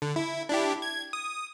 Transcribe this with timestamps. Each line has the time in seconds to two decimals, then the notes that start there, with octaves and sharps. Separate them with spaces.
0.02 D3
0.16 E4
0.49 D4 E4 G4
0.82 G#6
1.13 D#6